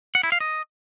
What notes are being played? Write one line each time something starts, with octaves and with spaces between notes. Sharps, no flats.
F#5
E4
F5
D#5